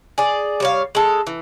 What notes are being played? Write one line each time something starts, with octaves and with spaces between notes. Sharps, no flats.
G#4 D5
G3 C#5 F5
G#3 A4
E3